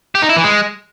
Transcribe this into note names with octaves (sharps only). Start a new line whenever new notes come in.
G4
D#4
E4
E3
G#3